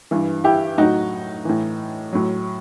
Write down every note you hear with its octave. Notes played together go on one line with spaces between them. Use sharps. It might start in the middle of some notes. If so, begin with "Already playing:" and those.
G2 E3
E4 G4
A2 F#3 D#4 F#4
A2 E3
A2 F#3